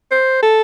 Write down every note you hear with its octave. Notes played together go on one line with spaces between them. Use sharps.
C5
A4